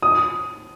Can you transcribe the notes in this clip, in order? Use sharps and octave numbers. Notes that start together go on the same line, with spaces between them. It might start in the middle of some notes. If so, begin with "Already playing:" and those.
D#6